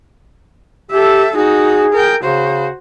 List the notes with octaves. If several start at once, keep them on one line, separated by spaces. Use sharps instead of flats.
G4 A4 E5
D#4 F#4 G#4
A#4 G5
C#3 F#4 C5